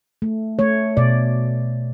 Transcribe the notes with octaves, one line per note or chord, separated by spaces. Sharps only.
A3
A3 C#5
B2 D5